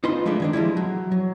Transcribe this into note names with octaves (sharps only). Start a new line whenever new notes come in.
D#4 F4 B4 C5 C6
F3 G#3 A3 D4
D#3 C#4 D4
F3 G3 G#3 E4
F#3
F#3